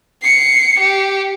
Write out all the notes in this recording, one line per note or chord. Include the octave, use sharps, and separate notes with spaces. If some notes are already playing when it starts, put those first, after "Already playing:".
C7 C#7
G4